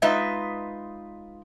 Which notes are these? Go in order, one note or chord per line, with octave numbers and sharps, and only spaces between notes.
G#3 D#4 F4 B4 D#5 E5